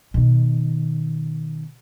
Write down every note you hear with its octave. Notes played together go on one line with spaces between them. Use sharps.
B2 D#3